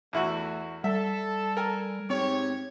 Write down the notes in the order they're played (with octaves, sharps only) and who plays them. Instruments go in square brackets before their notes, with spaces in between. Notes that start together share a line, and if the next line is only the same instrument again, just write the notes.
[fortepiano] E2 E4 F#4 [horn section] A3
[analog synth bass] G3 [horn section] A4 [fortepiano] E5
[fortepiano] A#4 G#5
[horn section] G#2 G4 C#5 [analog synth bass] C4